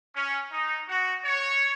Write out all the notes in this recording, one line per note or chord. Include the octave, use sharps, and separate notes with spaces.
C#4
D#4
F#4
C#5